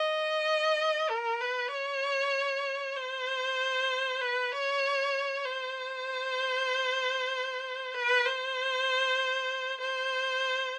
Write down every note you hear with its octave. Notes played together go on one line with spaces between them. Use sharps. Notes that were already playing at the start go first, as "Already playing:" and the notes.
Already playing: D#5
A#4
B4
C#5
C5
B4
C#5
C5
B4
C5
C5